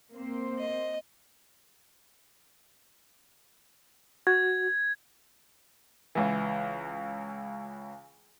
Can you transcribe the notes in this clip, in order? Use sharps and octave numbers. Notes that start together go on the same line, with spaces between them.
A#3 C4 C5
D#5
F#4 G#6
C#2 E3